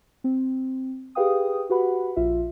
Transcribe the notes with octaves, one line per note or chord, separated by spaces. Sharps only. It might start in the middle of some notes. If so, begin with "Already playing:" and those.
C4
G4 G#4 B4 F5 G5 D#6
F#4 G4 B4 F#5 B5
A#1 F4 E5